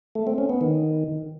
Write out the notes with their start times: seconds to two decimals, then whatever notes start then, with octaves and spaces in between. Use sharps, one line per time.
0.15 A3
0.27 C4
0.38 C#4
0.50 B3
0.61 D#3